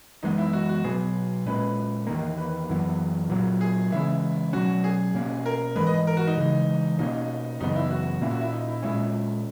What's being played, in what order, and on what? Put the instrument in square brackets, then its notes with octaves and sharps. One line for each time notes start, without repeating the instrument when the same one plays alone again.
[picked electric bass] F#2 E3 G#3 B3 [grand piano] D#4
[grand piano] E4
F#4
F#4
[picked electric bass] B2 F#3 B3 [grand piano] G#4
[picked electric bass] A#2 G#3 C#4 [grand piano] B4
[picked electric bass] E2 D#3 A#3
[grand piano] B4
[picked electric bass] F#2 E3 B3
A#2 F#3 A#3
[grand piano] G#4
[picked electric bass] C#3 E3 G#3 C#4 [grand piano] E4
[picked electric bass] B2 F#3 C#4 [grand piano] F#4
[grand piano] G#4
[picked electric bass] B2 A#3 C#4
[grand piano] A#4
[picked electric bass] G#2 E3 G#3 [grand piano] B4
[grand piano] D#5
A#4
F#4
D#4
[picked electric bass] C#3 E3 G#3
[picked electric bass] B2 A#3 C#4 [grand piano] D#4
[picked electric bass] F#2 C#3 E3 B3 [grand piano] D#4
[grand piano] E4
F#4
[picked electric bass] A#2 A#3 C#4 [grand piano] E4
[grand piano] F#4
E4
D#4
E4
[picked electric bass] A#2 G#3 C#4 [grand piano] E4